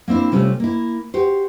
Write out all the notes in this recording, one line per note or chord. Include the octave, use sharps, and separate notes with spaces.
A#3 C4 D4 E4
C3 G3 A3 C4 C#4 F4
A#3 E4
F#4 G4 C5